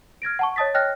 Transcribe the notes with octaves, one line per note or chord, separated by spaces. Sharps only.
F6 G#6 A#6 D7
F#5 A5 C#6
C#5 D#5 A5 D#6 A6 B6
C#5 D#5 G5 F6 F#6 A#6